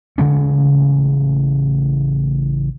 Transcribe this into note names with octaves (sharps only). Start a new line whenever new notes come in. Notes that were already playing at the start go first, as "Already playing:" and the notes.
A1 C#3 G#3 C#4